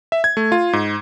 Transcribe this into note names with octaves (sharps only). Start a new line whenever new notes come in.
E5
G#6
A3
F4
G#2